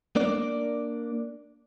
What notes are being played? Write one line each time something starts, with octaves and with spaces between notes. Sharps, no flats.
A#3 D4 D5